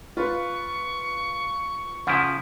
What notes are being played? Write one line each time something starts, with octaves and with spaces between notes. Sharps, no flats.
F4 B4 C#6
C#3 F3 E4 F#5